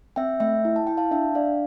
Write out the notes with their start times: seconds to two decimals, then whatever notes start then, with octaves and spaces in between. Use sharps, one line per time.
0.16 C4 E5 G5
0.40 A3 E5 G5
0.65 E4
0.76 A5
0.87 E4 G5
0.97 F5 A5
1.11 D4 E5 G5
1.35 D4 D5 F5